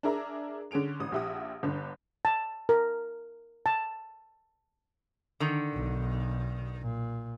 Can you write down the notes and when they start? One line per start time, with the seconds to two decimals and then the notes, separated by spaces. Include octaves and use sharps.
0.03 D4 G#4 A#4 E5 A#5
0.71 D3 C#4 G#4 D7 F7
1.00 A1 D#6
1.12 A#1 G4 E5 F#5 D#6
1.63 G1 D3
2.25 A5
2.69 A#4
3.66 A5
5.40 D3 D#3
5.74 B1 B2
6.81 A#2